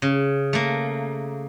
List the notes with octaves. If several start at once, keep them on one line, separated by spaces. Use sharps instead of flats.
C#3
A3 A#3